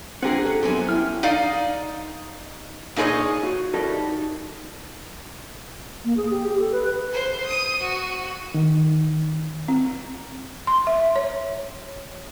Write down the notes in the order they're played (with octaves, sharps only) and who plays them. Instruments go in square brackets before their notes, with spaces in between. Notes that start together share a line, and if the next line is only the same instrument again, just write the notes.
[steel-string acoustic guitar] D3 F4 G#4 [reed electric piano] C4 G4 [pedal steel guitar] F#5 G#5 A#5
[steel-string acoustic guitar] C#4 [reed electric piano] A4
[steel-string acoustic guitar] F#2 F3 G#5 [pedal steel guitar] B3 C4 G4
[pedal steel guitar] C#4 G5 F6 [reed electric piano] E4
[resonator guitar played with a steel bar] D#4 D5 D#5 F5
A#2 D#4 G#4 B4 C#5 D#5
[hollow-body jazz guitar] F#4
E4 F#4 G4 A4 A#4 D5
D#4
[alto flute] A#3
G#4
G4
G4
A4
B4
[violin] C5
D#6 D#7
F#4
[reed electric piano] D#3
[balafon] C4
C6
E5
C#5